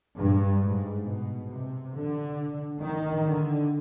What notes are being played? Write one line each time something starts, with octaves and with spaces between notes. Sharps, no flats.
G2
G#2
B2
C3
D3
D#3
D3